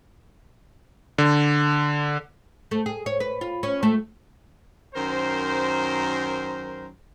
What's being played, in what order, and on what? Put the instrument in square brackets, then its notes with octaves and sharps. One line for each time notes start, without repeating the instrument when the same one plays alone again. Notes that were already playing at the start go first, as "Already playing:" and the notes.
[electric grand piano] D3
[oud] A3
G#4
C#5
B4
F4
C#4
A3
[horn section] F#2 D#3 A#4 C5